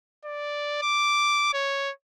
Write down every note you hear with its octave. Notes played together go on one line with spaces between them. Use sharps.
D5
D6
C#5